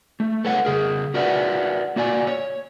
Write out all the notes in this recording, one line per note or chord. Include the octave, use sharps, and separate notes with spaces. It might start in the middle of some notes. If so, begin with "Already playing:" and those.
A3
A4 B4 C#5 F#5
C#3 G#4 A#4
F#4 A#4 B4 D5 E5 F#5
A#3 F#4 D5 G#5
C#5